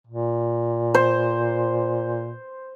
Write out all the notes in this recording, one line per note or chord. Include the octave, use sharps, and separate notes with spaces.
A#2
C5